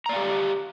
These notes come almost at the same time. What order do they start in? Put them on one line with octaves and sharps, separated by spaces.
A#5 D5 F5 G4